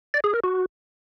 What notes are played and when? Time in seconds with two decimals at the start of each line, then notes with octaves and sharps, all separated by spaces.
0.14 D5
0.24 G#4
0.34 A#4
0.44 F#4